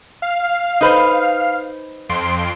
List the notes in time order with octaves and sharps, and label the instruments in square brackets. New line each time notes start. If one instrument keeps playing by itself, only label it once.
[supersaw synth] F5
[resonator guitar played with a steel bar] D#4 B4 C5
[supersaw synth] F2 C6 D7